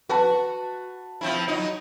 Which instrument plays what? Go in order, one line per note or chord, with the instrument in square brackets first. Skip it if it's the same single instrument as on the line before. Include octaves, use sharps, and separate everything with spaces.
[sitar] F#4 [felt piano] B4 A5
[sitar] F3 C4 E4
F#3 D#4